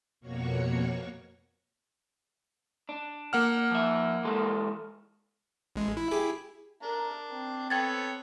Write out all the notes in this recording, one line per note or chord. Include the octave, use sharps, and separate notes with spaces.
F2 B2 A#3 F#4 C#5 C#6
D4
A#3 F#5 F6
F3 E5
E3 G#3 A4
A1 G#3
E4
G4 G#4
D4 A#4
C4
B3 A4 C#5 G5 G#6 A6